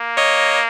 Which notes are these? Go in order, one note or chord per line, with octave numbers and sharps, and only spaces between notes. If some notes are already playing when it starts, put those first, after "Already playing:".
Already playing: A#3
C#5 D#5